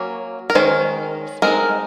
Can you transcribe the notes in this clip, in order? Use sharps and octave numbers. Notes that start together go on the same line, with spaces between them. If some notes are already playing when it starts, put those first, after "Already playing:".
Already playing: F#3 A#3 C#4
A#4
D#3 G#3 C#4 C5
G#3 C4 D#4 A#4